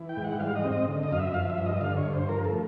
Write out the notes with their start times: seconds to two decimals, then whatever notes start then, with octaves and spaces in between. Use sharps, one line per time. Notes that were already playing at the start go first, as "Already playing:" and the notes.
Already playing: E3
0.09 G5
0.17 G#2
0.24 F#5
0.40 G3 F5
0.55 D#5
0.64 C4
0.72 D#5
0.88 D3
1.03 D#5
1.11 F#2 F5
1.19 E5
1.34 F3 F5
1.50 E5
1.58 G2
1.66 D#5
1.81 D3 F5
1.97 C#5
2.06 G2
2.13 C5
2.29 F3 A#4
2.44 A4
2.51 A3